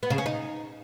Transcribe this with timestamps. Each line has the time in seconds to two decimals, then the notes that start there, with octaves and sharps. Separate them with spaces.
0.03 B3
0.10 C#3
0.18 C#4
0.26 D#4